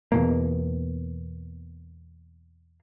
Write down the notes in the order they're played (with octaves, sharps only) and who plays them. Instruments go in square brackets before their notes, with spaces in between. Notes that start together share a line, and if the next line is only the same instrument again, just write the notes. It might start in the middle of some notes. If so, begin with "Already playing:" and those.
[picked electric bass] E2 B2 A#3